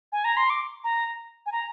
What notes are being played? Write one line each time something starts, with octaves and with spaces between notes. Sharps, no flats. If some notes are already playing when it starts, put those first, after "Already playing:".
G#5
A#5
C6
D6
A#5
G#5
A#5